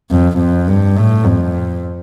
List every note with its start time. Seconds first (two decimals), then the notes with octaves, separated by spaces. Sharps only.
0.11 F2
0.39 F2
0.68 G2
0.97 A2
1.26 F2